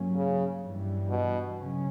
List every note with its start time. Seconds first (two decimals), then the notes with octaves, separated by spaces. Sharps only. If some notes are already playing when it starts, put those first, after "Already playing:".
Already playing: G2 F#3 A#3 C#4
0.16 C#3
0.63 G2 E3 G3
1.10 B2
1.57 C#3 F#3 C#4